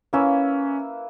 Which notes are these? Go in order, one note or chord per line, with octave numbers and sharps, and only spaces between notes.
A#3 C#4 E4 B4 E5